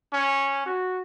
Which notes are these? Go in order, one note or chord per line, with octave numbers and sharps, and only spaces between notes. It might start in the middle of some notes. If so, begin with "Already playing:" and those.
C#4
F#4